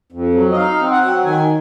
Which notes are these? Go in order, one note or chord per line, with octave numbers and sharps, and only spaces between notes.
F2
F#3
D#5
D#4 F5
C4
F#5
F#3
D#3 G#5